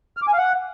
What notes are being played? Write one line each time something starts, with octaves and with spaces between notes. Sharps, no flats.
F6
D6
G#5
F5
F#5